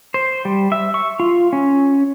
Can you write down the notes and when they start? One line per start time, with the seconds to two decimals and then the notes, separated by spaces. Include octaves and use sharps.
0.14 C5
0.45 G3
0.72 E5
0.94 C#6
1.20 F4
1.53 C#4